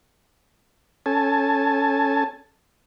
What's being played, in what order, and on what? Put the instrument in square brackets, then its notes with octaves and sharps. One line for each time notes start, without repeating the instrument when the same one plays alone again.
[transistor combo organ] C#4 A4 G#5 A5